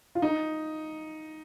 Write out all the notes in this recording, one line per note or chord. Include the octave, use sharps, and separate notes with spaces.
F4
D#4